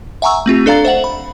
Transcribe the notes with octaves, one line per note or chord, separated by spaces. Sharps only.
E5 F#5 G#5 A#5 C#6 E6
A3 C4 F4 G4
D4 A4 D5 F5 A#5 A6
C5 E5 F#5 F#7
B5